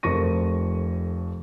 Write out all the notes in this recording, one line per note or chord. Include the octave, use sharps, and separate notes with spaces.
F1 F2 A#4 C#6 A#6 D#7